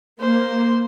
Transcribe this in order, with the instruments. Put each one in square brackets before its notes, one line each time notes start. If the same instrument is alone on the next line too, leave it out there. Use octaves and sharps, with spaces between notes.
[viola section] A#3 [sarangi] C5